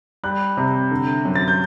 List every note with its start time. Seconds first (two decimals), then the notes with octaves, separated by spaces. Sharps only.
0.23 G3 F#6
0.57 C3
0.91 D3
1.25 F#2
1.36 A6
1.48 G6